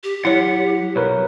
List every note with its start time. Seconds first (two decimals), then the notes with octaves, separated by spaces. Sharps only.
0.04 G4
0.25 F#3 E4 C#5 F#5
0.96 B1 A#4 B4 C#5